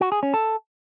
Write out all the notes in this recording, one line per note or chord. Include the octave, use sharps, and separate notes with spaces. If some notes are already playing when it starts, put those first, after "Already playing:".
F#4
G#4
C#4
A4